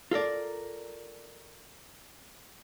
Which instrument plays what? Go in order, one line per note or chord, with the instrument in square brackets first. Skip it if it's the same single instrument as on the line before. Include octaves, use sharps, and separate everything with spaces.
[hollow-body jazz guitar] F4 A4 A#4 D5